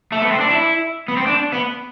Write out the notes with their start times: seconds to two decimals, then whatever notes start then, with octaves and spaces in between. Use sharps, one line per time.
0.12 A3
0.22 B3
0.31 C4
0.41 D4
0.50 E4
1.08 B3
1.17 C4
1.27 D4
1.52 B3